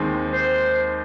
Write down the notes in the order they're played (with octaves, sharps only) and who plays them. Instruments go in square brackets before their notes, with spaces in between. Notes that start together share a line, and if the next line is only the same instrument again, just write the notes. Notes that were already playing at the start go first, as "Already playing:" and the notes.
Already playing: [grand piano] D#2 D#3 G#3 C4 D#4
[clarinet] C5